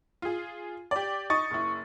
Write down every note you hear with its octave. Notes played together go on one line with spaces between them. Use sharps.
F4 G#4
G4 D5
D#4 C#6 D#6 A6
F#1 E4